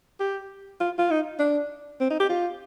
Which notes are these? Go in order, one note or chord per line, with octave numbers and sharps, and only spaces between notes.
G4
F4
F4
D#4
D4
C4
D#4
G4
F4